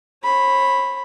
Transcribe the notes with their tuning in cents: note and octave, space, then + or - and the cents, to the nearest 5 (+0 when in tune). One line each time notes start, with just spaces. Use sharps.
C#5 -45 B5 +0